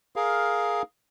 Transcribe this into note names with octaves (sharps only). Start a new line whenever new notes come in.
G#4 A#4 F5